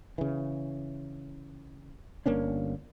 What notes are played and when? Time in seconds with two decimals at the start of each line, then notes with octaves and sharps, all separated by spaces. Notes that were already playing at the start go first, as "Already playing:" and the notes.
0.18 C#3 E3
2.26 G1 A#3 C#4 D4